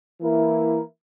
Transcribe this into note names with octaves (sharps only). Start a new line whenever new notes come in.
E3 A#3 E4 A#4